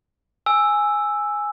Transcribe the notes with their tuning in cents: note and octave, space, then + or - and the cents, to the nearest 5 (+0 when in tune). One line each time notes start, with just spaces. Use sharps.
G#5 +0 E6 +0